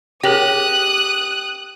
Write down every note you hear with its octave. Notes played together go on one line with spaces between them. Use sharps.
G4 G#4 A#4 C#5 D#6 F#6